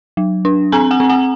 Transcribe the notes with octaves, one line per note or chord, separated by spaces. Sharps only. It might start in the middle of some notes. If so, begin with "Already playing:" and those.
F#3
D4
C4 G#5 A#5
F#5 G#5
C4
F#5 G#5